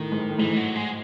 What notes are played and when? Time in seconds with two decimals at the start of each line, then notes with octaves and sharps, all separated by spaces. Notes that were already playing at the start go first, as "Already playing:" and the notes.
Already playing: A2 D#3
0.12 G#2
0.29 A2
0.39 G#2 E3
0.56 F#3
0.76 G#3